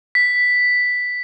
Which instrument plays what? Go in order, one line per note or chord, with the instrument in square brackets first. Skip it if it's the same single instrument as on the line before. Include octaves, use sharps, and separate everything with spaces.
[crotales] B6